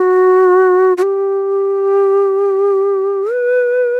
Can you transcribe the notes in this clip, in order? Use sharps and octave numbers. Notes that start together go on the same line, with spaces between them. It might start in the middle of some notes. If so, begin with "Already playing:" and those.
Already playing: F#4
F#4
G4
B4